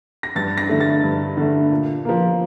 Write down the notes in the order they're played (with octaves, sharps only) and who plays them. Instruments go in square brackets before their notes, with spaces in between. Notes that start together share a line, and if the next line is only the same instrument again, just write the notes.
[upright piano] A#6
G2 A6
A#6
D3 A3
A6
G2
D3 A3
A#2
F3 A#3